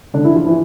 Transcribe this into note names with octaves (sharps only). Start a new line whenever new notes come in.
D3 D4
E3 E4
F3 F4
E3 E4